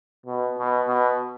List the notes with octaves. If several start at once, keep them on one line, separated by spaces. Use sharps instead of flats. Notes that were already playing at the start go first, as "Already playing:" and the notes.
B2
B2
B2